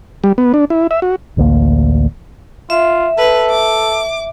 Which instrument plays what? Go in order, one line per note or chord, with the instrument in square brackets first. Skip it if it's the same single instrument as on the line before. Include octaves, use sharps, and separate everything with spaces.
[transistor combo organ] G3
B3
D4
E4
E5
F#4
[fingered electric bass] A1 D2 A3 A#3
[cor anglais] F4 [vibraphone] E5
[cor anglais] A4 [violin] B4
[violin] D6